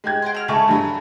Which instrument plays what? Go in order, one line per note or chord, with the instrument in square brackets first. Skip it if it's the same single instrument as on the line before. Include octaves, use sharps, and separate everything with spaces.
[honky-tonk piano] G#3 G4 G#6
[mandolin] C5 G5
F#4 F6
[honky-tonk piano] C#2 C#6 [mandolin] A3 G#5
[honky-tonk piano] G2 F#3